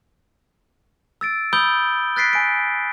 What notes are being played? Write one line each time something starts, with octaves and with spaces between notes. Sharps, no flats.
E6 A6 D7
B5 D#6 E6 G6 D7 G7
F#6 A6 B6 C7 D7
G#5 D7